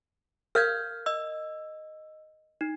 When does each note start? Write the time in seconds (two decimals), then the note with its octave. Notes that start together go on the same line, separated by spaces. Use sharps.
0.55 A#4 F5 F6 G6 G#6
1.06 D#5 E6
2.61 D#4